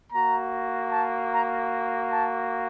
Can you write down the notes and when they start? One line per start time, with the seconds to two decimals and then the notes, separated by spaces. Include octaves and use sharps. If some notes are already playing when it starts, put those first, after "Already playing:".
0.12 A#3 F#4 A#5
0.91 A5
1.32 A#5
2.12 A5